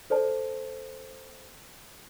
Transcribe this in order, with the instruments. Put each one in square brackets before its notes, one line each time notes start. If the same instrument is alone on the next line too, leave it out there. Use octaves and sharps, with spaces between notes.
[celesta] A4 C5 D5 A5